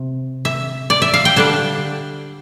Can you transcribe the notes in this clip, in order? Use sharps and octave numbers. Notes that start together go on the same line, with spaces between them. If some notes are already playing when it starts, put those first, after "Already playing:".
Already playing: C3
E5
D5
E5
F5
G5
D3 G3 D4 A5